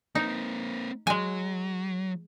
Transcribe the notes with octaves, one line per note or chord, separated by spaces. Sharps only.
A#3 C4 D#4
F#3 G#3 G#5